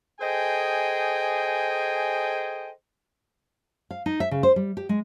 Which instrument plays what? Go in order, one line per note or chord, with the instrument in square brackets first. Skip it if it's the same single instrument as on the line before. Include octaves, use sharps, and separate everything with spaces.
[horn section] G#4 A4 C5 D#5 G5 G#5
[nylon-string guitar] F5
D#4
E5
C#3
C5
G3
G4
G#3